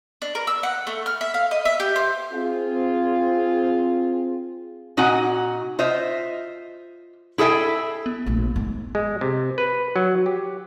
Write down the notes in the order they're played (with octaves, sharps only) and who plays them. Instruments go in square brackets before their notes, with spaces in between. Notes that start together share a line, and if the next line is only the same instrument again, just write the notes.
[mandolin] D4
A#4
E6
F#5
A3
F6
E5
F5
D#5
E5
G4
C5
[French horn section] C4 F4 G#4
[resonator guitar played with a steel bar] A#2 D#4 F#4 F#5 G#5
F4 C5 D#5 E5
E4 G#4 A4 E5 G5
[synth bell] B3
[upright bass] A#1 A3
G#2
[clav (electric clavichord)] G#3
C3
B4
F#3
G4